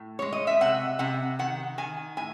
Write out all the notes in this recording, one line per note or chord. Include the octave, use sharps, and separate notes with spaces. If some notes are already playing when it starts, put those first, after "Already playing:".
Already playing: A2
G#3 C#5
D#5
E5
C3 F#5
C3 F#5
D#3 F#5
D#3 G#5
A2 G#5